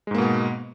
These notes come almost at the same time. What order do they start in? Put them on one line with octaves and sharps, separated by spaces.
G#3 G#2 A#3 B2 B3